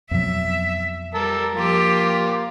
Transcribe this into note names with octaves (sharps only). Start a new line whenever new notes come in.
F2 B2 F#3 E5
G3 A#4 A5 E6
F3 A#3 F4 G4